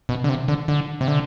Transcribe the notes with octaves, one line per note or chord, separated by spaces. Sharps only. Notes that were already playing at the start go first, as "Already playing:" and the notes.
B2
D3
C3
D3
D3
C3
D3